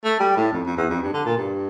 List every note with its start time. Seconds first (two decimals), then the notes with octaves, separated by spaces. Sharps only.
0.04 A3
0.20 G3
0.37 A2
0.53 F2
0.65 F2
0.77 E2
0.90 F2
1.02 G2
1.13 D3
1.26 A#2
1.38 G2